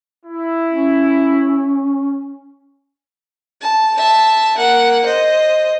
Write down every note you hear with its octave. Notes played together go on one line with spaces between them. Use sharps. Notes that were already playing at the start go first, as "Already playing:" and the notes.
E4
C#4
A5
E5 A5
A#3 F#5
C5 D#5